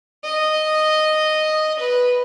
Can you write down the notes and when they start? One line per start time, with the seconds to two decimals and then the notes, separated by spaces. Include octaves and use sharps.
0.24 D#5
1.79 B4